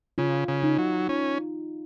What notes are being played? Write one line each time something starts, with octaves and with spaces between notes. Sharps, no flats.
C#3 F4
C#3
D#4
F#3
C#4 F4